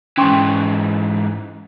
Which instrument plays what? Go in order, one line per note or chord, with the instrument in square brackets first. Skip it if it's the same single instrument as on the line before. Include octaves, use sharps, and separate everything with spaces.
[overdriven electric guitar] G#2 E3 [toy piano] C#4 C6 C#6